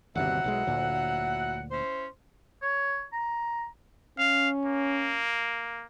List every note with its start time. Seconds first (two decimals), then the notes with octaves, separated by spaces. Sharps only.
0.15 G1 D#2 C3 F#3 E4 F#5
0.44 B1 F3 G#3
0.67 D2 A#2
1.70 C#4 E4 C5
2.62 C#5
3.12 A#5
4.18 C#4 F5
4.65 A#3